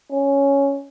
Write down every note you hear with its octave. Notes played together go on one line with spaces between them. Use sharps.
C#4